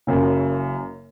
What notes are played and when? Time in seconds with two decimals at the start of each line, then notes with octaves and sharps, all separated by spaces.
0.07 F#1 F#2 C#3